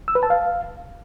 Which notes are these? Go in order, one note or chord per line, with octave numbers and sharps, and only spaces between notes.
E6
B4
A5
F5